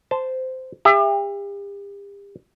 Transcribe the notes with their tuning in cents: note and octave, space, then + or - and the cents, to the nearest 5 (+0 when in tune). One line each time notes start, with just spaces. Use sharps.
C5 -15 A5 +0
G4 +40 E5 +20